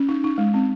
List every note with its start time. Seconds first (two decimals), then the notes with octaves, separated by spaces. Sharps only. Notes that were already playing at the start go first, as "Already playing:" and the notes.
Already playing: C#4
0.09 D#4
0.24 D#4
0.38 G#3
0.54 C4